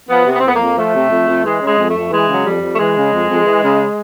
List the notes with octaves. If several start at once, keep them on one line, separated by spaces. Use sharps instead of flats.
F3 B3
C3
B3
C4
F2 B3
A#3
F2
F3 A3
C3
F2
F2
E3 G#3
C#3
G#3
F2
A3
F2
E3 G#3
C#3
F#3
F2 G3
F2
A3
E3 G#3
C#3
F2
F2
E3
C#3